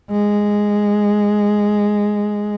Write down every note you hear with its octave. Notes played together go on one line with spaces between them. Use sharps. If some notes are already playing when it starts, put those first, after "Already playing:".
G#3